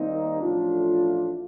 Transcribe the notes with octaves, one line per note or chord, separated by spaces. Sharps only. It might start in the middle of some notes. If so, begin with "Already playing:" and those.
Already playing: D#2 D#3 G3 A#3 C4 D#4
A1 A2 F3 A3 D4 F4